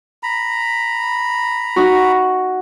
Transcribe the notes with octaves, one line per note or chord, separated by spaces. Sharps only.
A#5 B5
D#4 F#4